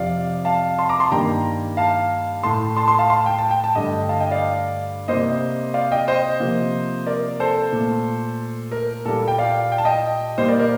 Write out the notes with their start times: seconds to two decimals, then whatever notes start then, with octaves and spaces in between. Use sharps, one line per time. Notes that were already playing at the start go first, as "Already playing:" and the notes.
Already playing: F2 C3 F3 D5 F5
0.45 F5 A5
0.78 A5 C6
0.89 A#5 D6
1.00 A5 C6
1.11 G2 D#3 G3 A#3 G5 A#5
1.77 F5 A5
2.43 A2 A3 A5 C6
2.76 A5 C6
2.88 A5 C6
2.99 F5 A5
3.10 A5 C6
3.26 G5
3.39 A5
3.51 G5
3.64 A5
3.75 G2 D3 A3 D#5 G5
4.09 F5 A5
4.20 D#5 G5
4.31 D5 F5
5.08 C3 G3 A#3 C5 D#5
5.74 D5 F5
5.92 D#5 G5
6.08 C5 D#5
6.40 C3 F3 A#3
7.06 A#4 D5
7.40 A4 C5
7.72 A#2 A3
8.72 A#4
9.05 A#2 G3 A#3 A4
9.28 G5
9.38 D5 F5
9.72 G5
9.78 A5
9.85 D#5 G5
10.37 A#2 G3 A#3 C5 D#5
10.48 A#4 D5
10.59 A#4 D5